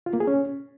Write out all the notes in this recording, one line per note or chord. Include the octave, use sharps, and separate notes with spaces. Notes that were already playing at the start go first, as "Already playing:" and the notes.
F4
A#3
G#4
C#4